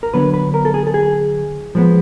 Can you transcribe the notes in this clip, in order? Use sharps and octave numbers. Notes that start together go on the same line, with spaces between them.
A#4
D3 F#3 B3 D4 B4
B4
A#4
A4
G#4
A4
G#4
F3 G#3 B3